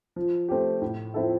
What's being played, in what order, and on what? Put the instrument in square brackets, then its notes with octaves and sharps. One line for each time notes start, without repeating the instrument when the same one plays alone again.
[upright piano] F3
A3 C4 G4
A2
F3 C4 E4 A4